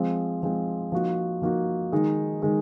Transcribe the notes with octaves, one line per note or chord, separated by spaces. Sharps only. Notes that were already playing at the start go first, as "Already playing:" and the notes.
Already playing: F3 G#3 C4
F3 G#3 C4
F3 A#3 D#4 F#4
F3 A#3 D#4 F#4
D#3 G#3 D#4
D#3 G#3 D#4